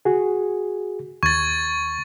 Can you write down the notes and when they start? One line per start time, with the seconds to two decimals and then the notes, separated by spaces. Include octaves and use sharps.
0.05 F#4 G#4
1.23 D#2 C#6 G#6 A6